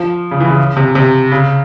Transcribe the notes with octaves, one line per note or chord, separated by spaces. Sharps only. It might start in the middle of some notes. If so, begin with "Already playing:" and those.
Already playing: F3
C#3
E3
C#3
C3
C3
C#3